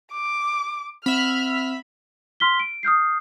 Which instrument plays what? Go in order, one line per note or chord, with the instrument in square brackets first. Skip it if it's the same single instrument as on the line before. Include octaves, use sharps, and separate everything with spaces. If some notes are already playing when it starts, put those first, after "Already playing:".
[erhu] D6
[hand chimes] C4 [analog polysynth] E5 B5 [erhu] F6
[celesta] C6 F6 B6 G7
D7
D#6 F6 G6 C7